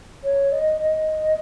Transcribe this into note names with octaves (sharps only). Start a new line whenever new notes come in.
C#5
D#5
D#5